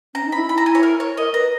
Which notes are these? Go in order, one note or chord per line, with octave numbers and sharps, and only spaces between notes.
C#4 A#5
D#4
B5
E4
B5
A#5
G#5
C#5
A#4
C#5
A#4 D#5
B4 A#5